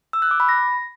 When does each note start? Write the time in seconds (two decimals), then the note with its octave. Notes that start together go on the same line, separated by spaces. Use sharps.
0.13 E6
0.22 F#6
0.31 D6
0.40 B5
0.49 A#6